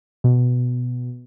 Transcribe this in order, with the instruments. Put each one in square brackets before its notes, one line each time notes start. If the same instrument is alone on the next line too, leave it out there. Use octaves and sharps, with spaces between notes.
[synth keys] B2